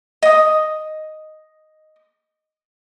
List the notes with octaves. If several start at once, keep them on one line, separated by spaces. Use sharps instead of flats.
D#5 D#6